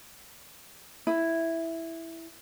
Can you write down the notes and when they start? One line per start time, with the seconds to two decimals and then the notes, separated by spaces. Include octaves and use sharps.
1.07 E4